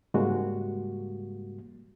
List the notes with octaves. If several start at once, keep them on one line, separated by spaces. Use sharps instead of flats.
G#2 C#3 G3 G#3 A#3 F#4